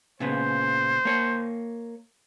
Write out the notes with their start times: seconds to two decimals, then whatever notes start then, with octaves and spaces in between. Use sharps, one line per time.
0.20 A#2 C#3 B3 C5
1.05 A#3 C#5